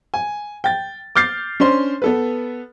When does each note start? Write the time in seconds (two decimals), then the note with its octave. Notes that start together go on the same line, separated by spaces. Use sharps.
0.14 G#5
0.64 G5 A6
1.16 D6 F6 G6 A6 C7
1.60 C#4 D4 C5 C6
2.02 B3 A4 B4